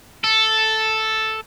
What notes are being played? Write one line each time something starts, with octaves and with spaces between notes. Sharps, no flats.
A4